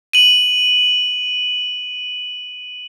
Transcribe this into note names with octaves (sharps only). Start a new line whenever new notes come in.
D#7 F#7